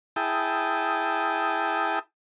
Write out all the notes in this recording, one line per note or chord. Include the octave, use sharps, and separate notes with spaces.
E4 G#4 G5 A5 D#6